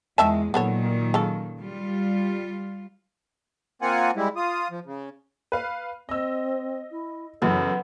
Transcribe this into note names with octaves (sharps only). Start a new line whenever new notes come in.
E2 D#3 G#3 E5 A5
A#2 D#3 F#3 B3 A4 C#5
C#3 A4
G3 F4
A#3 C4 F4 F#5 G#5
G3 G#3 E4
F4 D#6
F3
C#3
B4 F5
C4 D#5 E6
E4
F#2 C#3 E3 B3 A4